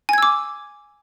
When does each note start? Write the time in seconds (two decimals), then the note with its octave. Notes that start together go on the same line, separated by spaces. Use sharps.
0.09 G#5
0.13 G#6
0.18 E6
0.23 D6